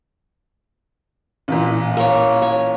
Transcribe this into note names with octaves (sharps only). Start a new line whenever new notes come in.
A1 A#2
A#3 C#5
C#5